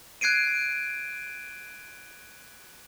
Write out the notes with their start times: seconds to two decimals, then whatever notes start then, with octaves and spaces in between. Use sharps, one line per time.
0.21 F#6 G#6 C7 D7 D#7